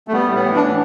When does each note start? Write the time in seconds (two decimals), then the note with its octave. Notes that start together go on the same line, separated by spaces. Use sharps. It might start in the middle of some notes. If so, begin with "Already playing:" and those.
0.08 A3
0.12 G3 B3
0.29 A2
0.35 B3
0.45 E3
0.56 D4
0.62 A2